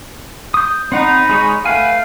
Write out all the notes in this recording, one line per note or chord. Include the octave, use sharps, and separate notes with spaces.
D#6 G6
C4 D#4 F#5 A#5 B5
G#3 G#4 C#5
A3 B4 F5 F#5 G#5